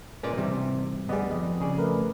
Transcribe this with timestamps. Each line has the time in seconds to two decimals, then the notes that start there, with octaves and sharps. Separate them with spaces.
0.23 A#2 G#3 C#4 A#4 B4 D5
0.38 G#2 C3 E3 G3
1.09 D2 G3 B3 G4 G#4 D5 D#5
1.31 F2 D#5
1.60 C#3 G#4 D5
1.78 A3 A#4 B4